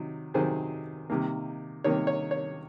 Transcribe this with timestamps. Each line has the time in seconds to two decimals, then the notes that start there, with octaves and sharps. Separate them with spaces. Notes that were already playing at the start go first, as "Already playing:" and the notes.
Already playing: C3 D#3 F#3
0.34 C3 D#3 F#3 G#4 C5
1.10 C3 D#3 A#3
1.84 C3 D#3 A#3 C#5
2.07 C#5
2.31 C#5